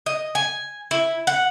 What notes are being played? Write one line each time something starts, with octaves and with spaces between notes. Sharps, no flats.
D#5
G#5
E4
F#5